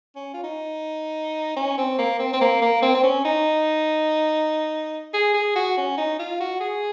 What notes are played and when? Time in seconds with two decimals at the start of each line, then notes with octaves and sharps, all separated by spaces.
0.16 C#4
0.34 F4
0.44 D#4
1.57 C#4
1.78 C4
1.99 A#3
2.19 C4
2.33 C4
2.41 A#3
2.62 A#3
2.83 C4
2.95 C4
3.03 C#4
3.25 D#4
5.14 G#4
5.34 G#4
5.56 F#4
5.78 C#4
5.98 D#4
6.20 F4
6.41 F#4
6.60 G#4